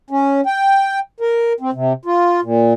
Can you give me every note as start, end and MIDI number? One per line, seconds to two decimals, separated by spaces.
0.10 0.41 61
0.46 0.99 79
1.20 1.53 70
1.60 1.70 60
1.73 1.93 48
2.05 2.40 65
2.42 2.73 46